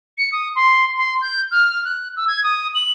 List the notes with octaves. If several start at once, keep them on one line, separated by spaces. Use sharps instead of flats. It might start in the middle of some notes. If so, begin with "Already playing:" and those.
C#7
D#6
C6
C6
G6
F6
F#6
E6
G#6
D#6
F#7